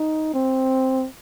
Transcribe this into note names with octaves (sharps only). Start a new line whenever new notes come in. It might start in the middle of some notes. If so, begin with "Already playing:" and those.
Already playing: D#4
C4